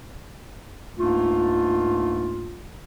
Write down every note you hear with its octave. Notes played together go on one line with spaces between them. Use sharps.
C#2 G#2 A3 A#3 D4 F4